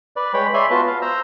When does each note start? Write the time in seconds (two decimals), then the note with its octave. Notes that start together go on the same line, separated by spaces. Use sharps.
0.16 B4 D5
0.34 G#3 B4 C#5 G5 B5
0.54 C#5 D5 E5 G#5 B5 C6
0.70 B3 F4 F#4 B4 A5
0.87 F5
1.02 C5 A#5 E6